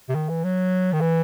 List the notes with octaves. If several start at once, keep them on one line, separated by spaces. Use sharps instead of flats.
C3
D#3
E3
F#3
D#3
E3